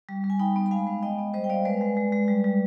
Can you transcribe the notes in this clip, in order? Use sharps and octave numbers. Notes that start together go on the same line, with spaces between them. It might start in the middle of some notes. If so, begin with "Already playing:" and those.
G3
G3
G#5
D#4 G5 B5
B3
B5
G#3 F5 G#5
G#3
B3 D#5 G5
B3
G3 C5 D#5
G5
G3 D5 F5
G#3 B4 D5
G#3
G#3
G#3
G3
G3